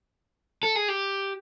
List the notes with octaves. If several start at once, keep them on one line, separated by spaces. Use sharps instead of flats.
A4
G#4
G4